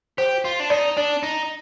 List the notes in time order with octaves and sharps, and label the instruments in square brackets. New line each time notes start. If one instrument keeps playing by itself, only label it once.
[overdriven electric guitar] G4 [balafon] C5
[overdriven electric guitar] F4
D4
[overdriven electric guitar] D#4 [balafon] D5
[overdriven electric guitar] D4 [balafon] D5
[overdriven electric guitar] D#4